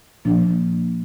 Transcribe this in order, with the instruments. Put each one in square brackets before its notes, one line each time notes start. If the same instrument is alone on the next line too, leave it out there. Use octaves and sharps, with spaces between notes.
[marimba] A#2 F3 A#3 D4